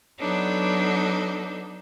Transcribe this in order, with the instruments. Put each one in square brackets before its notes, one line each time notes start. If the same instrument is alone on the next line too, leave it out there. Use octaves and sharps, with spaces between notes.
[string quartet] F#3 B3 D4 D#4 A4 C#5